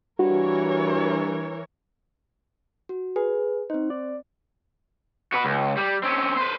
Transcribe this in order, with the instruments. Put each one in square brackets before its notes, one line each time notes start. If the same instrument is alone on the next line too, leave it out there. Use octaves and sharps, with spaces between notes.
[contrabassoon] G2 [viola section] E3 A#4 C#5 [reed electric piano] F#4
[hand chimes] F#4
[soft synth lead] G#4 [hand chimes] B4
[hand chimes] C4 C5 [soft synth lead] D#4
[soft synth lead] D5
[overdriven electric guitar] F#4 B4
C#2
G3
C4 C#4
B4 C5